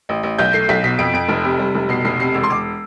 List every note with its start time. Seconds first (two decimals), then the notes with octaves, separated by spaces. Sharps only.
0.09 A1
0.23 A1
0.38 B1 G6
0.53 A3 C7
0.69 B1 B6
0.83 B2 B6
0.99 F2 D7
1.13 F2 D7
1.28 F1
1.45 C3
1.59 G3
1.75 F1
1.89 B2 C7
2.05 F1 C7
2.20 C3 C7
2.34 E1 E6
2.43 C6
2.50 E1 D6